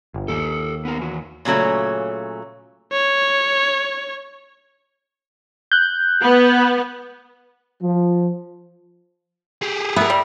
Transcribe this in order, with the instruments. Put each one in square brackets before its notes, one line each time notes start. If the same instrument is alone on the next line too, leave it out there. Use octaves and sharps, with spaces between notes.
[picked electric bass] G1
[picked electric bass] D#2 [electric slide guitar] G4 A4
[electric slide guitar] B3 D#4 A#4
E3 F#4
[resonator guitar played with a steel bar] A#2 C#3 F#3 A3 C#4
[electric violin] C#5
[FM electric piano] F#6 G6
[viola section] B3
[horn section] F3
[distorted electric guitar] G4 G#4
[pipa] B3 [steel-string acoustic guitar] A#4 E5
[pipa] G3